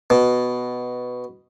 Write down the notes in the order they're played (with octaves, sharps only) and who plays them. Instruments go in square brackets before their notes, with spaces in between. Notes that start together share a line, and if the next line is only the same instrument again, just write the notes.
[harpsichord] B2